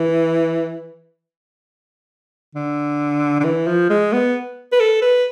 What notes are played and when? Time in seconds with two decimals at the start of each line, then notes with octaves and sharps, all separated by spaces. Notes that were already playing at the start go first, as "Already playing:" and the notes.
Already playing: E3
2.55 D3
3.40 D3
3.44 E3
3.67 F3
3.90 G#3
4.13 B3
4.72 B4
4.80 A4
5.02 B4